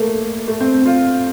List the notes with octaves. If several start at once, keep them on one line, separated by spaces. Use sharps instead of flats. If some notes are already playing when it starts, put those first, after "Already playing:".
Already playing: A3 A#3
A3
C4
F4